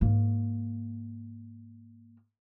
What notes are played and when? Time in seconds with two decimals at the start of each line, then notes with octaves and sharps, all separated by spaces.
0.01 G#2 A#3